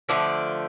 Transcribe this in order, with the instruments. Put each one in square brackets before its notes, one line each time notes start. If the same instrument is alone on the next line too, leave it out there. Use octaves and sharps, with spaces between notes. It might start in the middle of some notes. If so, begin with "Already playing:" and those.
[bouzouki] D3 F3 A3 D5